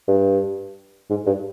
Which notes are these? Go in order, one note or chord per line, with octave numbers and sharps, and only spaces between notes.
G2
G#2
G2